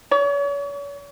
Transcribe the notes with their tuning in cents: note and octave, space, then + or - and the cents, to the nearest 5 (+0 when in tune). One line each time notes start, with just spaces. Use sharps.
C#5 +40